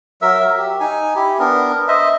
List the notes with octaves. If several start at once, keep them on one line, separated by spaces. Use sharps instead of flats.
F#3 A#4 E5 E6
G4
D#4 G#5
E4 G4
B3 D4 A#4
C5 D#5 E5